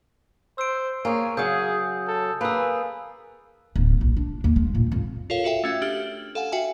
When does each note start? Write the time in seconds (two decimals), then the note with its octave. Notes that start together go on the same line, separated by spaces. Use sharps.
0.58 C5 E6 D7
1.05 A#3 G#4 C#5 G#5
1.37 C#3 F#3 G#4 D#6 G6
2.07 A4
2.41 A#3 G#4 B4 G#5 E6
3.76 D1
4.01 A#1
4.17 D4
4.44 D#2
4.56 G#3
4.75 A#2
4.92 F2
5.30 F4 A4 A#4 C#5 F5
5.44 F#4 A4 E5 G5
5.64 A3 C#4 E5
5.82 D4 G4 F6 F#7
6.35 A4 F5 F#5 G#5
6.52 F#4 E5 G5 G#5